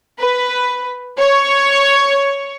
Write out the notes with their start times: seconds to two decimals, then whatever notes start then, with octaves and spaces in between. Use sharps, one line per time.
0.19 B4
1.18 C#5